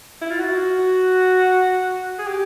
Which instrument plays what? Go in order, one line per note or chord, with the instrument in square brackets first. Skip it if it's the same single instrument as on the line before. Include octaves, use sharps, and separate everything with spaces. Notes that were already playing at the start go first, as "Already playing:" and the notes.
[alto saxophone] E4
F4
F#4
G#4
G4